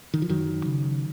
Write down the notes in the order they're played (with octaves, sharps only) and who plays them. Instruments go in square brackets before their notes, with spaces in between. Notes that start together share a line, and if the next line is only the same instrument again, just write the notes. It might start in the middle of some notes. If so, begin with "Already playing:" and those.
[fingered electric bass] D#3
F3
F#2 D#3 F#3
C#3